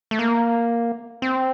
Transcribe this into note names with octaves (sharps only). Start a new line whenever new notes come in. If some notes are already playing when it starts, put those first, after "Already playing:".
A3
A#3
C4